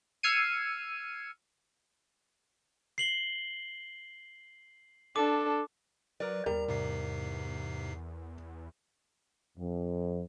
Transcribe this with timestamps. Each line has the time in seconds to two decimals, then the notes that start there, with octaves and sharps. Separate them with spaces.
0.23 E6 F6 G#6 C7 C#7 D#7
2.98 C7 F#7 G7
5.16 D4 A4 D6
6.20 F#3 A#4 B4 D5
6.46 D#2 G3 A#4 A#5
6.68 E2 G#2 C3 C7
9.58 F2